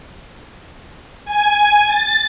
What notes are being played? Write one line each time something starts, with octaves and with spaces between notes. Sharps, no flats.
G#5
A6